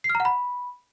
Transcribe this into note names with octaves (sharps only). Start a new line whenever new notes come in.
C7
F6
A#5
F#5
B5